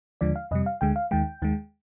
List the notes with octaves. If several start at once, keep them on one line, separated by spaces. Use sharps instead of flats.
D#2 D3 F3 G#3 D5
F5
F2 C3 G3 D#5
F5
D2 D3 G#3 G5
F5
D#2 D#3 G#3 G5
D#2 D#3 G#3